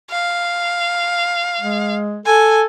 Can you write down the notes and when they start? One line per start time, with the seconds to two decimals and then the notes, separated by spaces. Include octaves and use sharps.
0.10 F5
1.60 G#3
2.26 A4 G#5